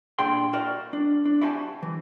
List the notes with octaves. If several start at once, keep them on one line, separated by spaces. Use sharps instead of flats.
A#2 D4 G4 G#4 G5 C6
F#4 A#4 D5 D#5
D4
D4
E4 F#4 G4 G#5 A5
E3